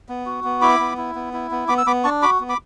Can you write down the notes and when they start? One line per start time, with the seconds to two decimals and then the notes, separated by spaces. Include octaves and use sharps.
0.09 B3
0.26 F#4
0.44 B3
0.62 E4 B5 D6
0.80 B3
0.97 E4
1.15 B3
1.33 E4
1.51 B3
1.68 B3 B5 D6
1.78 E6
1.86 B3 B5 D6
2.04 D4 A5 C#6
2.22 F#4 B5 D6
2.40 B3
2.49 B5 D6